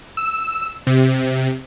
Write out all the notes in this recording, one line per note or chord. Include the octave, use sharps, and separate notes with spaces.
E6
C3